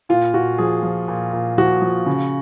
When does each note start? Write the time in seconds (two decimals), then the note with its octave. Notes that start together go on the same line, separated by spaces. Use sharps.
0.09 A#2 F4
0.34 A#2 F#4
0.58 F3 G#4
0.83 F3
1.08 A#2
1.33 A#2
1.58 F3 F#4
1.82 F3
2.06 C#3